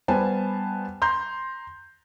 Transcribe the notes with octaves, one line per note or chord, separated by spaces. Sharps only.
G3 B3 C5 G#5 A5
A#5 C6 G6